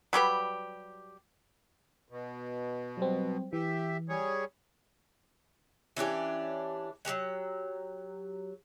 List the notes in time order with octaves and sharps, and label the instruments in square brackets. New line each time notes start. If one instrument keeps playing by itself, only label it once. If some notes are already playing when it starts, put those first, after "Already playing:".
[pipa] F#3 G3 G4 B4
[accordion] B2
[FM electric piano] F#3 G3 C4
[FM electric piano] E3 [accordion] G4 E5
[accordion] G3 G#4 C#5
[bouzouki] E3 C#4 D4 G4
F#3 F#4 G4 F#5